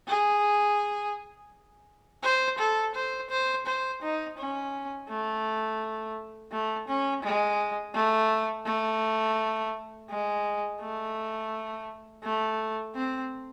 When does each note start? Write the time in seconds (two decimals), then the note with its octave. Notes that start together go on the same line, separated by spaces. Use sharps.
0.08 G#4
2.23 C5
2.59 A4
2.95 C5
3.30 C5
3.66 C5
4.02 D#4
4.38 C#4
5.09 A3
6.52 A3
6.88 C#4
7.24 G#3
7.94 A3
8.66 A3
10.10 G#3
10.81 A3
12.23 A3
12.95 C4